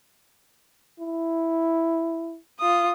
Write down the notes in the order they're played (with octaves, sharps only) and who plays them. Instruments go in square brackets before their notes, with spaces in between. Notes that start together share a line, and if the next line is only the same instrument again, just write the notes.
[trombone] E4
[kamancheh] F4 D#6